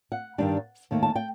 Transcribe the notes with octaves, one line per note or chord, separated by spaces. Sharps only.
F#5
G2 D#3 G3 D4
D#2 D#3 A3
A5
G5